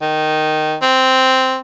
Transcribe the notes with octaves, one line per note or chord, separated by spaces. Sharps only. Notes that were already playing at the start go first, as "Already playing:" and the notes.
D#3
C4